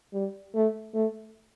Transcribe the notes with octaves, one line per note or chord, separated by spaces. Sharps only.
G3
A3
A3